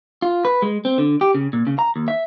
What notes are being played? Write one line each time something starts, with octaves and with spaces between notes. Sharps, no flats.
F4
B4
G#3
C4
D3
G4
C#3
A#2
C#3
A#5
D#2
E5